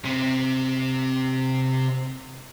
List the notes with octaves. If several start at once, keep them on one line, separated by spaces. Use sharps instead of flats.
C3 C4